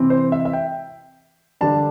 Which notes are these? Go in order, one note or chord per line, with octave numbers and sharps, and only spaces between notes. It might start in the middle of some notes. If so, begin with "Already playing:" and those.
Already playing: C3 E3 C4
C5
E5
E5
G5
D3 G3 D4 A5